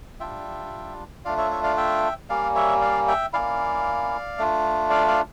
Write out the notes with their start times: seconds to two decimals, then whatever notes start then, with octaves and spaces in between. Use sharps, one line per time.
0.20 G3 D4 F4 E5 G5
1.25 A3 D4 F4 D5 F5
1.38 C#5 E5
1.51 C#5 E5
1.64 D5 F5
1.77 E5 G5
2.29 G3 A#3 C#4 D5 F5
2.56 C#5 E5
2.81 D5 F5
3.08 E5 G5
3.33 A#3 C#4 E4 D5 F5
4.38 A3 D4 F4
4.90 D5 F5
5.08 D5 F5